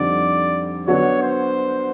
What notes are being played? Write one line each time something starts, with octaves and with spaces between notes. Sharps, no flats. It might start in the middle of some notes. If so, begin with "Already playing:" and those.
Already playing: F2 D3 G3 C4 D#4 D5
D3 F#3 B3 D4 F#4 C#5
C5